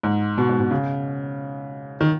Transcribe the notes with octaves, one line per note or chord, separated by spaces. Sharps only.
G#2
B2
G#2
B2
C#3
D#3